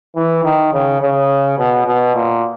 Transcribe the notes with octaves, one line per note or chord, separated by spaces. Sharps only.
E3
D#3
C#3
C#3
B2
B2
A#2